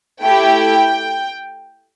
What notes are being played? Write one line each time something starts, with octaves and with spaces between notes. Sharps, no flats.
A3 E4 G4 G5